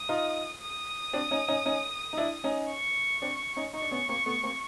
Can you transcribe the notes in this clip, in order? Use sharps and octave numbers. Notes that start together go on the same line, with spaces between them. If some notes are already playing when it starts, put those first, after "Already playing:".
Already playing: D#6
D#4 F4
D#6
C4 D4
C#4 D#4
C#4 D#4
C#4 D#4
D#4
D4 E4
C#4 D#4
C#6
C4 D4
C#4 D#4
D#4 C#6
D4
B3 C#4
A#3 C4
A3 B3
A#3 C4